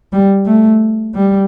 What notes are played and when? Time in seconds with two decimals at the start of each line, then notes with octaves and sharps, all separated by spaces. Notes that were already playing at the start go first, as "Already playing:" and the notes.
0.13 G3
0.46 A3
1.15 G3